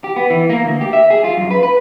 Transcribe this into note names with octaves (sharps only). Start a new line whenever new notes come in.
G4
B3
E3
A#3
D2
G4
E5
G#4
F4
F#2
B4
B4